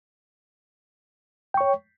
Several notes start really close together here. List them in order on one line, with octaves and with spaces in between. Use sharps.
G5 C#6 C#5